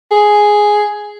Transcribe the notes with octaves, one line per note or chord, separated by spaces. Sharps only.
G#4